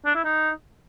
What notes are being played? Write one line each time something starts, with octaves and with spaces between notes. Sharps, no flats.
D4
E4
D#4